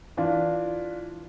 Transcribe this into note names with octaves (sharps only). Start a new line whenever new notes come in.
E3 D4 F4